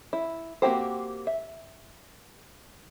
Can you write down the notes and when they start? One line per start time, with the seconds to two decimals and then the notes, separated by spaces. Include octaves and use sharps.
0.13 E4
0.62 A#3 C4 F#4 G4 C5
1.27 E5